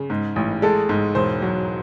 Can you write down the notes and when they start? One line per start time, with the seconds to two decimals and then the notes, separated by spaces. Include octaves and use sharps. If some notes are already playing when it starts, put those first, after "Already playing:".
Already playing: C#3
0.10 G#2
0.36 A1
0.62 G#3 A4
0.89 G#2
1.15 E1 C5
1.42 F#3